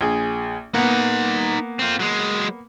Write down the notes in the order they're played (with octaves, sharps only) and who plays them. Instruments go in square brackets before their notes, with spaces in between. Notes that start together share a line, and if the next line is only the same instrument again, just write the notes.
[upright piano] A#1 G#4
[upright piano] A#3 B3 [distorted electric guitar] D#4 F#5
[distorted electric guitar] C4 F4
F#3 G#3